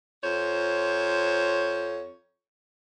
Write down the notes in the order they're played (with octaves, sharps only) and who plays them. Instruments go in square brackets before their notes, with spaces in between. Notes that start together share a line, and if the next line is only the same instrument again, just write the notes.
[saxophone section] F2 C5 C#5